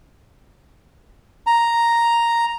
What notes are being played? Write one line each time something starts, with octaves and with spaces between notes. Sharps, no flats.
A#5